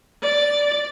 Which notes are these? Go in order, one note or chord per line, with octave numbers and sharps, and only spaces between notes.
D5